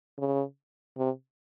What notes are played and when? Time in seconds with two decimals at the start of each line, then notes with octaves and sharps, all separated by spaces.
0.18 C#3
0.98 C3